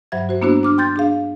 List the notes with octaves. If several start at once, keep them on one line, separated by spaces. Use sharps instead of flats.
G2 F#3 C5 E5 G#6
F#4 C5
A#3 B3 D4 E4 F#4 C5
D4 D6 F6
G5 C6 G6 A6
D4 G#4 F5